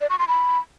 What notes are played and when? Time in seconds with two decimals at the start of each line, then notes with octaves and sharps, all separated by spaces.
0.01 D5
0.10 C#6
0.19 C6
0.28 B5